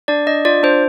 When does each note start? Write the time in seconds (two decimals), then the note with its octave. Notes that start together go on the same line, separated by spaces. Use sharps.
0.08 D4 D5
0.26 D4 D#5
0.45 F4 D5
0.63 D4 C5